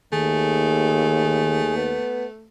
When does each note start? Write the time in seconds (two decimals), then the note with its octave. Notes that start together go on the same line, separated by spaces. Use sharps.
0.12 D#2 D#3 A3 G#4
1.77 B3